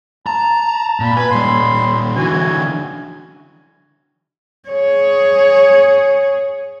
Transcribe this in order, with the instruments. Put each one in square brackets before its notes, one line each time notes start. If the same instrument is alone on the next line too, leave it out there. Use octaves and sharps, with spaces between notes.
[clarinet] A5 [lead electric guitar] A#5
[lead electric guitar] A#2 [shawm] B5
[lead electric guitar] B4 [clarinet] G#5
[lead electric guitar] A#2 G3 [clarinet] C6
[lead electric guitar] D3 E3 [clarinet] F#4 [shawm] G#5
[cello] G#4 C#5